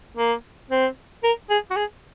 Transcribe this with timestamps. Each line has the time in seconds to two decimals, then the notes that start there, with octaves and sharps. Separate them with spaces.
0.17 A#3
0.70 C4
1.24 A#4
1.50 G#4
1.71 F#4
1.76 G#4